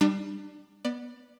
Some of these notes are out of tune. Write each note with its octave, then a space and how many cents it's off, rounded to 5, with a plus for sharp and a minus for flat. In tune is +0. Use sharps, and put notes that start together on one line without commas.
G3 +0 D4 +35
B3 -10 D5 +20